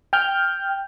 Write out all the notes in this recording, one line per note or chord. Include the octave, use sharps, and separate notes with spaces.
G5 F6 G6